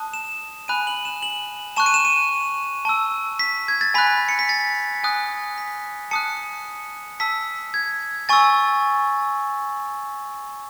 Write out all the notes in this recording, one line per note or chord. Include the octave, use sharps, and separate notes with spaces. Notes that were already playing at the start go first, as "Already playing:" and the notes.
Already playing: A5 D#6 F#6
E7
G#5 B5 F#6 D#7
F#7
E7
F#7
A5 C#6 F#6 E7
D#7
E7
D#7
A5 E6
B6
G#6
A6
G#5 B5 F#6 B6
C#7
B6
A6
G#5 D#6 F#6
B6
A5 D#6 F#6 C#7
A5 E6 B6
G#6
G#5 C#6 E6 A6